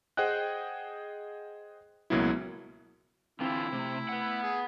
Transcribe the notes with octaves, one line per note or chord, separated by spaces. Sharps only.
G#4 C5 D#5 F#5 G5 F#6
C#2 B2 F#3 A#3 B3 E4
D3 E3 C4 E4 F4
C3 A3
B4 F#5
G#4